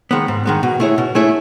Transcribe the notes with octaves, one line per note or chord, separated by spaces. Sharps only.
D#3 G#3 B3
G#2
D#3 G#3 B3
B2
A3 E4 G#4 C#5
B2
A3 E4 G#4 C#5